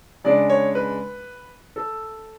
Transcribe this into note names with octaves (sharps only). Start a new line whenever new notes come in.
C#3 G#3 D4 D5
C#5
B4
A4